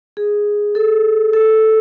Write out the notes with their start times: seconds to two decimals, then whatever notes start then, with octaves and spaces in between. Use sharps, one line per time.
0.17 G#4
0.75 A4
1.33 A4